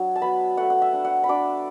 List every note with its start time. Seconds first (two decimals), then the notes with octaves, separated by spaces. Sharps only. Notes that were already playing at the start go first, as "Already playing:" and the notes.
Already playing: F#3 D4
0.16 A5
0.22 B3 B5
0.57 A3 F#5
0.70 F#5
0.82 E5
0.93 D4
1.05 F#5
1.24 B5
1.29 D4 D6